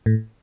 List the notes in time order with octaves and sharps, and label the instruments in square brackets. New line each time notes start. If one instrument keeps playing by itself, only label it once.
[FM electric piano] A2